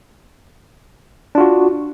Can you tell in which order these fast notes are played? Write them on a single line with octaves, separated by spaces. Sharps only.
D4 F4 F#4